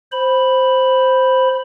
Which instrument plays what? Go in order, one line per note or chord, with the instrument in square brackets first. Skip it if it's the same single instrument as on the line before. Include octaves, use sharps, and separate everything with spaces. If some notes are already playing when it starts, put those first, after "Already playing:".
[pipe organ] C5 B5